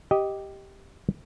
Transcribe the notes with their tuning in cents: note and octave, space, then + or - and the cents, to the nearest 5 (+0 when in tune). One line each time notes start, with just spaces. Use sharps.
G4 +0 D#5 +5